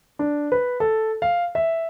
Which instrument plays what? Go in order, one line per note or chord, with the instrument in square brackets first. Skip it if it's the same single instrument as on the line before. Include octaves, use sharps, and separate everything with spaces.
[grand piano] D4
B4
A4
F5
E5